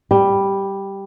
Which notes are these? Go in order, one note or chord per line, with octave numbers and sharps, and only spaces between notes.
G3